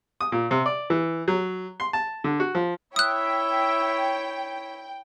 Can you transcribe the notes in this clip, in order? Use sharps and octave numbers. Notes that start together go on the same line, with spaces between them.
D#6
A#2
C3
D5
E3
F#3
C6
A5
D3
F#4
F3
E4 C#5 E5 G5 D#6 F#6